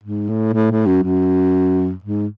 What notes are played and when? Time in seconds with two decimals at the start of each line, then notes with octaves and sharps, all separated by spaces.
0.04 G#2
0.29 A2
0.53 A2
0.71 A2
0.86 F#2
1.03 F#2
2.04 G#2